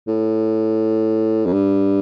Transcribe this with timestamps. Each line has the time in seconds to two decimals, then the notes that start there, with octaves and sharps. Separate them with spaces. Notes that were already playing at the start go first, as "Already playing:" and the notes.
0.07 A2
1.46 F2
1.53 G2